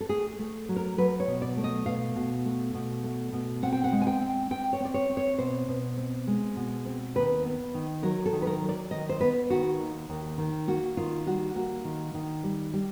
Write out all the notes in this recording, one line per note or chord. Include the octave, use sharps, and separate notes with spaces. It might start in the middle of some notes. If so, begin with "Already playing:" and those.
A4
A3 G#4
A3
F#3
A#4
F#3 B4
C#5
B2
D5
A3
D#5
B2 F5
B2
A3
B2
A3
B2
C4 F#5
G5
F#5
G#3
G#5
G5
C4
C4 G5
C#5
C4 D5
C#5
C4
C#5
B2 C5
B2
C4
G#3
B2
C4
D#2 B4
B3
D#3
F#3 A#4
A4
D#3
B4
A#4
F#3
D5
D#3 D#5
C5
B3 B4
D#3 F#4
D#2
D#2
D#3
A#3 F#4
D#3 F4
G3 F#4
A#3 F#4
D#3
D#3
G3
G3